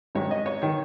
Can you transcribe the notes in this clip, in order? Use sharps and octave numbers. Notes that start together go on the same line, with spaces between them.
G#1 G#2 D#3 C#5
D#5
C#5
D#3 C#5